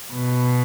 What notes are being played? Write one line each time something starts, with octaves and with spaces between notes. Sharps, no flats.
B2